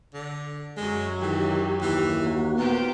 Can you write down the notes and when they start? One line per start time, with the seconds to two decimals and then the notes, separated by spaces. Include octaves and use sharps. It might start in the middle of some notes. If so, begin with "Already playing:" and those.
0.14 D3
0.77 F#2 F#3 G#3
1.22 D#3 E3 G4
1.82 D#2 E3
2.26 A#3 F#4
2.58 A#2 B3 F4 G4 C5